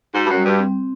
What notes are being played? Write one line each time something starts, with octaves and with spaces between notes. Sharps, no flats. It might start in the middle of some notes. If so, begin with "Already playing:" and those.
G#2 F#4
G2
F#2
G3
G2
C4